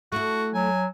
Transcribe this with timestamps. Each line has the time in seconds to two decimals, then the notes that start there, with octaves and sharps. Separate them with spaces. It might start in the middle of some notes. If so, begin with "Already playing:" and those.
0.12 A3 E4 F#4
0.54 F#3 G#5